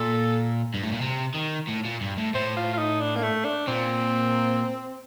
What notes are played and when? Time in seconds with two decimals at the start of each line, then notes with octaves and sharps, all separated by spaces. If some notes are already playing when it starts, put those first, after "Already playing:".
Already playing: A#2 A4
0.74 G2
0.83 A2
0.92 A#2
1.02 C3
1.34 D#3
1.67 A2
1.85 A#2
2.01 G2
2.18 A2
2.34 A2 C5
2.56 F4
2.74 F4
2.78 D#4
3.01 D4
3.16 A#3
3.23 A3
3.45 D4
3.67 A#2 C4